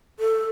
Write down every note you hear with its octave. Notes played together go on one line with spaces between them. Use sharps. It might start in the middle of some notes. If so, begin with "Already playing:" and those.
A4